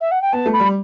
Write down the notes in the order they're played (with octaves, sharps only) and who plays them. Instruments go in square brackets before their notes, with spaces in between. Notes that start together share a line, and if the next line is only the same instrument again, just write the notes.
[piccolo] E5
F#5
G5
[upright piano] B3 [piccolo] A5
[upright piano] A3
[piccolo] B5
[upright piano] G3